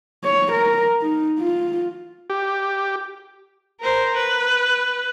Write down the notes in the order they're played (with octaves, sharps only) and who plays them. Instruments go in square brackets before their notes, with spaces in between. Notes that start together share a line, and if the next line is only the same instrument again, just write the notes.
[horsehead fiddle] C#5
A#4
D#4
F4
[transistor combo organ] G4
[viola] A#4 C5
B4